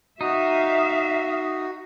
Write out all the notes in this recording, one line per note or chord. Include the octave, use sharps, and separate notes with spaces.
D#4 F#4 E5 F5